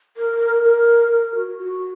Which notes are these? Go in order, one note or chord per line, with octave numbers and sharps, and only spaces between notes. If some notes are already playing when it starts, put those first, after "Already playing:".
A#4
A#4
A#4
F#4
F#4